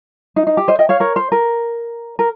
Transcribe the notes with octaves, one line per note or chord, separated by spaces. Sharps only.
D#4
D#4
G4
C5 D#5
D#5 G5
C#5 F5
A#4 C#5
C5
A#4
A#4